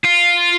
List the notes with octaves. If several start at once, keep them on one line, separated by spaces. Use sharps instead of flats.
F4